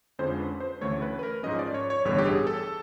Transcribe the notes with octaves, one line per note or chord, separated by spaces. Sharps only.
F2 D3 F3 G#3 C#4 C5
B4
C5
D2 C#3 E3 A3 C#5
B4
B4
A#4
G#2 F3 G#3 C#4 D#5
D5
C#5
C#5
A1 G2 D3 G3 B3 C#5
G4
G#4
A4